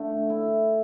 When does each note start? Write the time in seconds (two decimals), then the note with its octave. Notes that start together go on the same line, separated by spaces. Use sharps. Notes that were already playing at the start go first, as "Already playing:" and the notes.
Already playing: D3 A3
0.30 E4